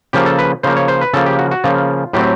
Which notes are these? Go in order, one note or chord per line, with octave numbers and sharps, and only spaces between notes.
C#3 F3 A#3 G4
A4
B4
C#3 F3 A#3 C5
C#5
C5
B4
C#3 F3 A#3 A4
G4
F#4
F#4
C#3 F3 A#3 F4
A2 F#3 A3 C4 G4